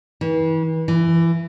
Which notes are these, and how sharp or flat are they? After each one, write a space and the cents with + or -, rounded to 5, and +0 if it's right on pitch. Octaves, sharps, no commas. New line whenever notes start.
E3 -35
E3 +20